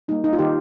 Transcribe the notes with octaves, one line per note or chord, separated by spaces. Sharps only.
G3 A#3 D#4
D#4
F4
D#3 D#4 G4